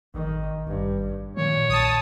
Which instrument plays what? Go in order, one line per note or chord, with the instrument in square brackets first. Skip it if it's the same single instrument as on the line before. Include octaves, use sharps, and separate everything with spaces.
[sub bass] G#1 [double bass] D#3
[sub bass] G#1 [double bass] G2
[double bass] A#2 [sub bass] D#3 [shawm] C#5
[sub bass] A#1 [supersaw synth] A5 D#6